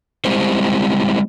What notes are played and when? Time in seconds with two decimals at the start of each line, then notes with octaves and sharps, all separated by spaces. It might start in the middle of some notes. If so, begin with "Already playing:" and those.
0.25 G3 G#3 C4 E4 G4 C5